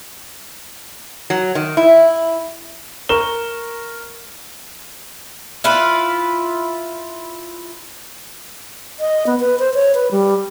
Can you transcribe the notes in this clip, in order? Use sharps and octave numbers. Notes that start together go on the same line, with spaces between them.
F#3
D#3
E4
A#4 C#6 E7 G7
E4 F4 B4
D#5
B3
B4
C5
C#5
B4
G3